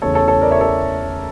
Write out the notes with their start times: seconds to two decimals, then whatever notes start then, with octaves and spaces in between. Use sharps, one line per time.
0.02 E2 C#3 E3 A3 A4 C#5
0.15 A4 C#5
0.28 A4 C#5
0.41 A#4 D5
0.51 C#5 E5
0.61 A4 C#5